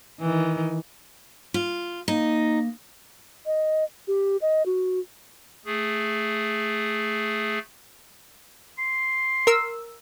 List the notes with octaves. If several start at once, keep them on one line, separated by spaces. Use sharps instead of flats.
D#3 E3
F4
A#3 D#4
D#5
G4
D#5
F#4
A3 G#4
C6
A#4 E6